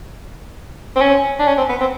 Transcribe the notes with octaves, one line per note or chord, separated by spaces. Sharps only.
C4
C#4
D4
C#4
C4
B3
C4